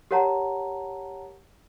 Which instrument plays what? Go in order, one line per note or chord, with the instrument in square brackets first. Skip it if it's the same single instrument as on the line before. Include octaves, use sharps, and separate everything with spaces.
[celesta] G4 A#4 C#5 F#5 A5 A#5